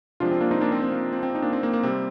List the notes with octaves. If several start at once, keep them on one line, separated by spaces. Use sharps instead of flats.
C3 F3 G#3 D4 F4
C4
A#3 D4
C4 D#4
A#3 D4
C4
C4
A#3
C4
C4
D#4
A#3 D4
C4
A#3
A#3
C3 G3 C4